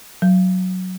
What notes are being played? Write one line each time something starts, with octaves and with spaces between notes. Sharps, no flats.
F#3